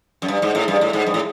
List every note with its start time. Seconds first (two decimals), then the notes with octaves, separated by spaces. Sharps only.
0.22 F#2
0.28 G2
0.42 G#2
0.55 A2
0.68 G2
0.81 A2
0.93 G#2
1.06 G2
1.14 A2